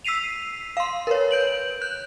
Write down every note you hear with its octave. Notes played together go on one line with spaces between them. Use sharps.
E6 B6 C7 D#7 F7
F5 C6
A#4 B4 C#5
G6 D7 F#7
F#6 G6